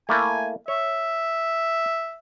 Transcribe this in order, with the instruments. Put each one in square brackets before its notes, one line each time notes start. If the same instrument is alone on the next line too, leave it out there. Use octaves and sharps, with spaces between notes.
[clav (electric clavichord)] A3 A#3 E4 [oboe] G#5
[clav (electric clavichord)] C#5 [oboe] E5